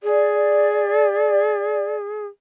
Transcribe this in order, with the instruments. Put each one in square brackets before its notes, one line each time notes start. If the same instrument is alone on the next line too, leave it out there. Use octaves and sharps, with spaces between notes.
[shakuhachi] G#4 [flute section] D5